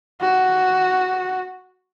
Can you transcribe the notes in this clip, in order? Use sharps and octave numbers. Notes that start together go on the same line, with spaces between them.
F#4